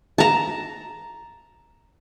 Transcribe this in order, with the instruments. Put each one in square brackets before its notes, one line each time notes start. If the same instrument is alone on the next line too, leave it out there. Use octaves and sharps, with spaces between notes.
[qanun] A5 A#5